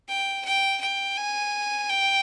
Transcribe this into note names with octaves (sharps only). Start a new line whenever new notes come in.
G5
G5
G5
G#5
G5